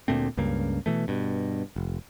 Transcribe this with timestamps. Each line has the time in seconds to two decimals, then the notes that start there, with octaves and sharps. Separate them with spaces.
0.08 D2 A#2 A3 C4
0.37 C#2 G2 C#3 A#3
0.86 B2 E3 A3
1.08 G2 B2
1.76 F1